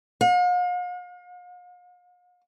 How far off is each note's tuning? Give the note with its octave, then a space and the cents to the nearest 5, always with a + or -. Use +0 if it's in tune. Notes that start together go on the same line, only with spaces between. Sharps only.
F5 +45